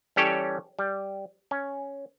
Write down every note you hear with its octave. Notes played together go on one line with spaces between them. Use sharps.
E3 G3 C#4 G4 A4 C#5
G3
C#4